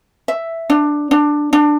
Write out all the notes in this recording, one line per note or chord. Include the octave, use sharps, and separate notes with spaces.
E5
D4
D4
D4